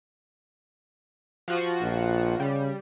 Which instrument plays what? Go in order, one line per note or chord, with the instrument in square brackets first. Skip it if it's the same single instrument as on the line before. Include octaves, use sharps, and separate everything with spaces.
[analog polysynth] F3 F4 F#4
[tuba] A#1
[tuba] C#3 [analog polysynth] G3